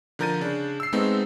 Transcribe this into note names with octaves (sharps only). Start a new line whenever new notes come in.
D3 F3 A#4 G6 A6 D#7
C#3 D4
E6 C7
G#3 A3 B3 C4 D#4